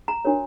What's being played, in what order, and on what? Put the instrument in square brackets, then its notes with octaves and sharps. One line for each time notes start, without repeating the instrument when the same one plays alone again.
[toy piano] A#5
D4 F#4 A#4 C#5